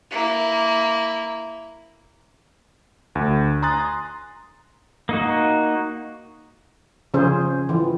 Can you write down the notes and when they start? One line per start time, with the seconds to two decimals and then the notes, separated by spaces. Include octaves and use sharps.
0.11 A#3 E4
3.15 D2
3.62 G#5 A#5 C6 D#6 F#6 A6
5.09 A#3 D#4 F#4
7.14 C#3 F3 C#4 G#4 C5
7.69 E3 F4